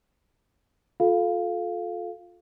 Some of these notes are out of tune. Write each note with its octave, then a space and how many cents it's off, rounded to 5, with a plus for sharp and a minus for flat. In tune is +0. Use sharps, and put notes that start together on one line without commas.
F4 +25 A4 -15 F5 +0